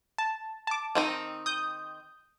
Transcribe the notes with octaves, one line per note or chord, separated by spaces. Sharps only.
A5
A5 D6
D#3 C4 D#4
D#6 G6